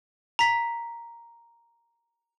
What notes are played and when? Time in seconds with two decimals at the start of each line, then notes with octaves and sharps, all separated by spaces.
0.39 A#5 B6